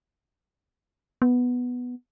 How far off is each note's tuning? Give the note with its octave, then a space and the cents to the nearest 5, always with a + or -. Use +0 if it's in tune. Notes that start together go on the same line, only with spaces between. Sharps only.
B3 +0